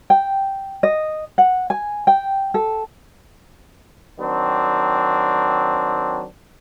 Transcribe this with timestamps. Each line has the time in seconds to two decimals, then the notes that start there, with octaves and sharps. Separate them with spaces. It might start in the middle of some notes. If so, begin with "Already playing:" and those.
0.10 G5
0.83 D#5
1.38 F#5
1.70 G#5
2.07 G5
2.54 A4
4.20 D#3 F#3 C4 D4